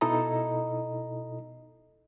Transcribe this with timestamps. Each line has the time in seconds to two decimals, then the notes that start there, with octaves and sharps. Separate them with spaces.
0.01 B2 D#4 E4 A4 D#5 A#5